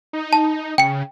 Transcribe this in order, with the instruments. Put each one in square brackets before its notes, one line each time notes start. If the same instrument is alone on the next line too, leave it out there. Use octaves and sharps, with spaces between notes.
[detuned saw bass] D#4
[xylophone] A5
[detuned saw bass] C#3 [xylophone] G5 C#7